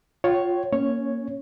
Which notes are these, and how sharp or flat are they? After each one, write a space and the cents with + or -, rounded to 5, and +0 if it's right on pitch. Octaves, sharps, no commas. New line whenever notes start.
F4 +10 C#5 +0 G5 -35
A#3 +0 C#4 +0 C#5 +0